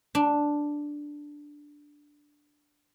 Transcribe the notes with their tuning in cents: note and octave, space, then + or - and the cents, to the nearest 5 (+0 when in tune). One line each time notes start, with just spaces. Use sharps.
D4 +0